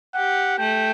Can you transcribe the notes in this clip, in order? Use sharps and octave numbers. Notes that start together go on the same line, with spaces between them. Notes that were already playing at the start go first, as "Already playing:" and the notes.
G4 F#5
A3 G5